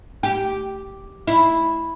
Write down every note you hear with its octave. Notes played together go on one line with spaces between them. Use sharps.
G4
E4